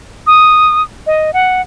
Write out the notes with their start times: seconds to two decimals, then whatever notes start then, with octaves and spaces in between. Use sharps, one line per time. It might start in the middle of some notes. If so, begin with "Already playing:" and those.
0.27 D#6
1.07 D#5
1.33 F#5